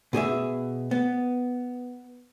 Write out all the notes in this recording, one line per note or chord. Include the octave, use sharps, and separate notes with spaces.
B2 G#4 C#5 E5
B3